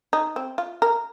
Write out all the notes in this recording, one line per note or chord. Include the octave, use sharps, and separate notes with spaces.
D#4
C4
F4
A#4